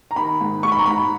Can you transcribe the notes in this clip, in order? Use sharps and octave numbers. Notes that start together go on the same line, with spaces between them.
A#5
D#3 B5
G#2
G#2 C#6
B5
A#5
G#2 B5